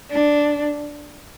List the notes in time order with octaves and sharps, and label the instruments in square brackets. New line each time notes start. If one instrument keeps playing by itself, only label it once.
[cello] D4